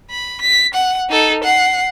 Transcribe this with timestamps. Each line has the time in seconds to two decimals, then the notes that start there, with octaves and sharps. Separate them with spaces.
0.11 B5
0.41 B6
0.74 F#5
1.10 D#4 A4
1.43 F#5 C7